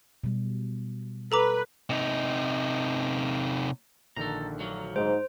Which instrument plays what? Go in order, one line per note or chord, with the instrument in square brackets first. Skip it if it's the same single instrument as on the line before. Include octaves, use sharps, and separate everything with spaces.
[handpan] B2 G3
[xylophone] A4 A#5 D6 [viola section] B4
[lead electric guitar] C3 D#4
[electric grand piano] A#1 D3 D#3 [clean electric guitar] A4 A#5
[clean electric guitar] D2 F#3 A#3
[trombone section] G#2 [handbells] C5